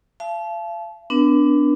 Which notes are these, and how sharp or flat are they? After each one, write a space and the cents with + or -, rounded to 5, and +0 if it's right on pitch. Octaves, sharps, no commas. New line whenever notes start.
F5 -40 A5 -30
B3 +40 D4 +0 A#4 +45